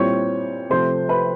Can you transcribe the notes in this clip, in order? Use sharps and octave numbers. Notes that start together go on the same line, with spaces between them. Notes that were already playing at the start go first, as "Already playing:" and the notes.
Already playing: A#2 G3 C4 E4 C#5 C#6
C3 F3 A3 C5 C6
B4 B5